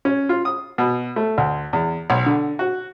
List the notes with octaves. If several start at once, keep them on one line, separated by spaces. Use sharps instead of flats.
C#4
F4
D#6
B2
A3
D2
E2
B1
D3
F#4